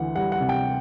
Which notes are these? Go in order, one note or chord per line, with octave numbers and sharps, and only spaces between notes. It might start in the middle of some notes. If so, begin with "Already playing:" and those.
Already playing: D2 E3 F#5
G3 F#5
F#5
C3
G5